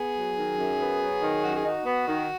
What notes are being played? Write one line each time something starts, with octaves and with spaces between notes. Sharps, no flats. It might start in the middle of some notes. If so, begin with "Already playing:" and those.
Already playing: B3 G#4
F#3
D#3
F#2
B3
F#3
D#3
F#2 F#4
G#4
D#4 F#4
B3
D#3